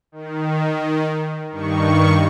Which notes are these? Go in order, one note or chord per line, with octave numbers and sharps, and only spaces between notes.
D#3
G2 D#3 C#6